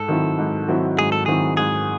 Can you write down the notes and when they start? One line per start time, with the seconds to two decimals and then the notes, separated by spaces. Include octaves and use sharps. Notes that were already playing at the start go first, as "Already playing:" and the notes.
Already playing: G#2 A4
0.08 D#3 F#3 C4 E4
0.39 G#2
0.68 D#3 F#3 C4 E4
0.98 G#2 G#4
1.12 A4
1.26 D#3 F#3 C4 E4 G#4
1.57 G#2 G#4